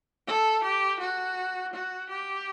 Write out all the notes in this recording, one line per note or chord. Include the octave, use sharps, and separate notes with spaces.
A4
G4
F#4
F#4
G4